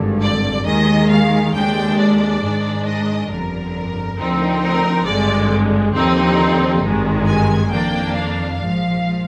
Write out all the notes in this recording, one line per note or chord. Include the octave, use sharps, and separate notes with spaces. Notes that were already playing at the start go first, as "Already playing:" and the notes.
Already playing: G#1 G2 D3
D5
D#2 D#3 G#3 D#5
F5
D#2 D3 G#3 D4 G5
D5
G#2 D#3 G#3 D4
D#5
G1 F2 D3 A#4
D2 D3 F3 C4 D#4
A#4
G#1 G2 D3 G#3 D5
D#2 D3 F3 C4 D#4
G#1 G2 D#3 G#3
G#5
F2 D#3 A#3 D4 G5
F5
A#1 G#2 F3